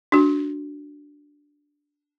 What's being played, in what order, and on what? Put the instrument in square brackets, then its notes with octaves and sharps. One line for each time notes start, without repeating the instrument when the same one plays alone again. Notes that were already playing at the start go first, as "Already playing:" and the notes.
[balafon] D4 F#4